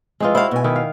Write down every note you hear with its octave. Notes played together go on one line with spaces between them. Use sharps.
F2 E3 G#3 D#4 F4
E4 F#4 C5 F5
B2 G#5
D#3 E4
F5